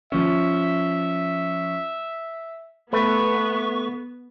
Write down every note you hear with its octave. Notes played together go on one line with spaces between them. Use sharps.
F3 C#4 E5
A3 B3 B4 C#6